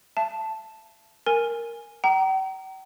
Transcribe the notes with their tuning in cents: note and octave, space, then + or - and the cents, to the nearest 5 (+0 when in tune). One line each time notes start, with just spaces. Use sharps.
E5 +40 A5 +0
A#4 +0 G#5 -5
G5 -45 A#5 +0